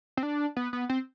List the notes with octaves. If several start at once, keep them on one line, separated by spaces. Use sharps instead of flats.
C4
D4
B3
B3
C4